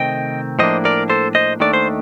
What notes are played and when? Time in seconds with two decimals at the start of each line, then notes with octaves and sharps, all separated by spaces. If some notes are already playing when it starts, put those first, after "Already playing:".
Already playing: C3 D#3 A3 C4 D#5 G5
0.59 A2 F3 A#3 D4 C5 D#5
0.85 A#4 D5
1.10 A4 C5
1.35 C5 D#5
1.60 D#2 D#3 A3 D4 D5
1.74 C5